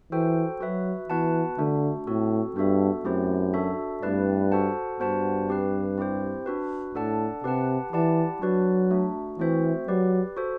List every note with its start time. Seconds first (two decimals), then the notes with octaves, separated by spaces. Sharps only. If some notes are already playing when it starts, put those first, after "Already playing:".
0.12 E3 F#4 A4 C5 G5
0.61 F#3 F#4 B4 E5
1.09 E3 B3 F#4 B4 F#5 A5
1.58 D3 A3 D4 F#4
2.07 A2 C4 F#4 A4
2.56 G2 B3 D4 F#4 A4 E5
3.05 F#2 A3 C4 E4 G4 C5
3.54 D4 F#4 A4 E5
4.03 G2 A3 C4 E4 B4 D5
4.52 F#4 A4 C5 F#5 A5
5.00 G2 B3 F#4 C5 F#5 A5
5.49 C4 G4 B4
5.98 C4 E4 G4 C5
6.46 D4 F#4 B4
6.95 A2 D4 A4 D5 F#5 A5
7.44 C3 G4 B4 F#5 A5
7.93 E3 E4 G4 D5 F#5 A5
8.42 F#3 D4 F#4 B4 D5
8.91 A3 D4 F#4
9.39 E3 A3 C4 F#4 C5 E5
9.88 F#3 G4 B4 D5
10.37 F#4 A4 C5